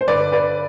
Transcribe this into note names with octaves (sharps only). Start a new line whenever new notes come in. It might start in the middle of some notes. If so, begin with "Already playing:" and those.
C5
G1 B4 D5
B4 D5